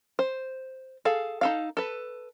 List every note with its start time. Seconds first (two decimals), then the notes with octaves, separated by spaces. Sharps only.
0.19 C5
1.05 G#4 A4 F5
1.41 D#4 A4 F5
1.77 A4 B4